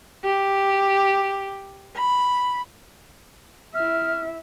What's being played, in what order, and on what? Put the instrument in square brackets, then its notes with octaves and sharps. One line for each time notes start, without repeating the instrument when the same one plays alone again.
[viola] G4
B5
[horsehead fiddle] E4 E5 [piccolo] F6